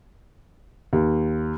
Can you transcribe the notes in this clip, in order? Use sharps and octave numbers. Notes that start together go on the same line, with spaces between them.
D#2